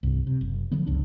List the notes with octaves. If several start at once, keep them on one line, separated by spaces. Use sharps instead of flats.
C2 G2
C3
F#1
D3 F3 F#3 B3
G1 C#2 D3 D4